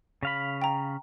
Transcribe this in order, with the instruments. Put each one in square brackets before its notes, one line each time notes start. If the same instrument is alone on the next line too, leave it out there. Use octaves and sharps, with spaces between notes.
[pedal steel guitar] C#3 F5 B5
[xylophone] G5 A#5